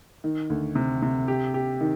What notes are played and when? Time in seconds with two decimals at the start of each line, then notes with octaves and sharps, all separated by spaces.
0.24 D#3
0.50 D2
0.75 C3
1.02 C3
1.28 G4
1.54 G4
1.81 D#3